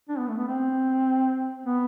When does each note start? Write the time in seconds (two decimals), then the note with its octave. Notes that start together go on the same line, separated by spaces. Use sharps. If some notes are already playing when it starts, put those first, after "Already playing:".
0.09 D4
0.18 B3
0.28 A3
0.38 B3
0.48 C4
1.66 B3